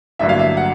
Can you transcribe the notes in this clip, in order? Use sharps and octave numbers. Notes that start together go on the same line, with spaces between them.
A1 G2 D3 F#3 A#3 E5
F5
E5
F#5